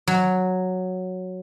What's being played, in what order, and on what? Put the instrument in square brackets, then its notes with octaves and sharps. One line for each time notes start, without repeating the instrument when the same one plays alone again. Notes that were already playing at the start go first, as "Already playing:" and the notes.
[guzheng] F#3